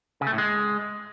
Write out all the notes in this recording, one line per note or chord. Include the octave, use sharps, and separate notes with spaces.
C#3
A3
A2
G#3